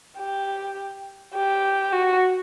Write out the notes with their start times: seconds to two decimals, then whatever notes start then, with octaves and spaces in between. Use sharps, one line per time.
0.18 G4
1.35 G4
1.93 F#4